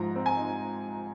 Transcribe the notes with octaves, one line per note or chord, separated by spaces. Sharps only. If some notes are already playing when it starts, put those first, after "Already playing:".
Already playing: G#2 F3 D#4 A#5
C4
G#5
D#4